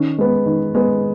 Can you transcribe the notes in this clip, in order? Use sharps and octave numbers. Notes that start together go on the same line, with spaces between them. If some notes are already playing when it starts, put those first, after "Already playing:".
Already playing: D#3 C#4
G#3 B3
D#3
G#3 B3